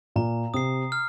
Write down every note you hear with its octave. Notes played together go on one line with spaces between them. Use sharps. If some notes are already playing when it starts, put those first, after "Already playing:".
A#2 A#5
C3 D#6 C7
F6